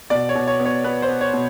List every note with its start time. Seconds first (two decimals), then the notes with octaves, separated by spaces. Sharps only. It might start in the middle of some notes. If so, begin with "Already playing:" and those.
0.10 B2 D5
0.29 C#5
0.35 B2
0.47 C#5
0.60 B3
0.65 C#5
0.84 B3 B4
1.02 C5
1.09 B3
1.21 C#5
1.33 B2